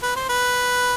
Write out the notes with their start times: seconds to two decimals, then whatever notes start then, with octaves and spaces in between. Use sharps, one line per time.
0.03 B4
0.16 C5
0.29 B4